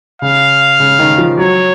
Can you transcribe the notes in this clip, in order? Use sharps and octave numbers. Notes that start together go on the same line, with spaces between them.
C#3 F5
C#3
D#3
F3
F#3 C#5